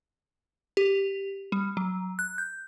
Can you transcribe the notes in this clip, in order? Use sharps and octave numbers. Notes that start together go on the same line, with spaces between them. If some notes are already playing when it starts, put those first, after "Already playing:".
G4
G3
F#3
F#6
G6